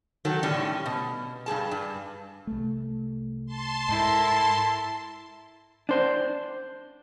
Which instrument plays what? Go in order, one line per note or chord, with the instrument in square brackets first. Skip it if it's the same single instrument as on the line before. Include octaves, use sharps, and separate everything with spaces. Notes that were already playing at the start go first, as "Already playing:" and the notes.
[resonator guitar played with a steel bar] D#3 F#3 A4
A2 D3 G3 C#4
B2
G2 G3 G#4 A5
G2
[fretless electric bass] C2 A3
[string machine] A5 C6
[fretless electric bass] G#2 [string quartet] E4 A4 A#4
[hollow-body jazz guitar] D4 C5